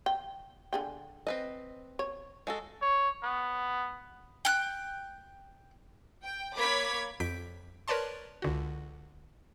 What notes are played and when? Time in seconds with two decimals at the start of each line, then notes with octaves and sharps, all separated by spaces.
0.06 G5
0.73 D3 G#4 G5
1.27 C4 B4 D#5
1.99 C#5
2.47 G#3 F#4 A4
2.81 C#5
3.23 B3
4.45 G5 F#6
6.23 G5
6.57 A#3 C#5 B5 D6 G#6 B6
7.20 F2 G6 B6 D7
7.88 A#4 B4 C#5 D5 A5 C6
8.42 C#2 D3 F#4